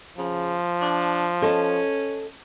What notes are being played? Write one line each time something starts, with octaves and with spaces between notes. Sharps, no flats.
C#3 F3
D4
C#4 A4 D#5 A5